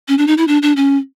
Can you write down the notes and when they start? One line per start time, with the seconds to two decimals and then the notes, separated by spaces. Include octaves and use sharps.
0.08 C#4
0.18 D4
0.27 D#4
0.38 E4
0.48 D4
0.63 D4
0.76 C#4